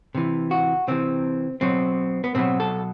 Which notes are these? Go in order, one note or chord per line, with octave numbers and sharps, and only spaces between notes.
C3 E3
F#4
C3 E3 C4
B2 F#3 C4
B3
B2 F#3 C4
A4